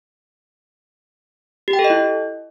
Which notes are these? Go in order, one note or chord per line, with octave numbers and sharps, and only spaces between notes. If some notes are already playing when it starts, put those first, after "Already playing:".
G4
G5
A4
D#5
E4